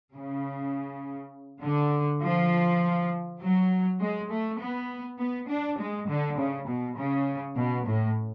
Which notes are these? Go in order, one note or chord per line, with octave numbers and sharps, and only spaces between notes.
C#3
D3
F3
F#3
G#3
A3
B3
B3
D4
G#3
D3
C#3
B2
C#3
B2
A2